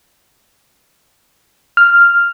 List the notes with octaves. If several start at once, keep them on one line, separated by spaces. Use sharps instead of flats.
F6